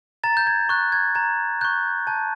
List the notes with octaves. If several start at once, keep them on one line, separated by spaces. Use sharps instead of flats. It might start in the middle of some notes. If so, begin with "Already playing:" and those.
A#5 A6
G6
G#6
C#6 F#6
G#6
A#5 G#6
C#6 F#6 G6
A5 G6